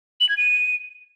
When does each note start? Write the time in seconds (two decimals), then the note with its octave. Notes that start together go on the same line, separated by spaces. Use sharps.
0.20 F#7
0.29 G#6
0.37 D#7